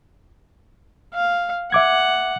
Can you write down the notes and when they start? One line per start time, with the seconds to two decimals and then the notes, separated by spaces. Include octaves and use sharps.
1.14 F5
1.72 E5 F#5 D6 G#6